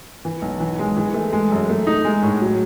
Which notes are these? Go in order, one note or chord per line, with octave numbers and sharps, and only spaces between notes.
E3
B1
E3
G#3
E3
A3
G#3
F#2
A3
D#4
G#3
A2
F#3